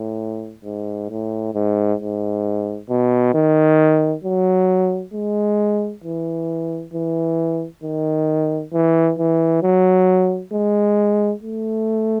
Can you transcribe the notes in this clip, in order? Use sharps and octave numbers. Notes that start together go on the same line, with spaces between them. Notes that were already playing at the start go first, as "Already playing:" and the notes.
Already playing: A2
G#2
A2
G#2
G#2
B2
D#3
F#3
G#3
E3
E3
D#3
E3
E3
F#3
G#3
A3